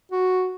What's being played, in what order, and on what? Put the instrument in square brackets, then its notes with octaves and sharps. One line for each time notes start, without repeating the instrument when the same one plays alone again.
[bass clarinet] F#4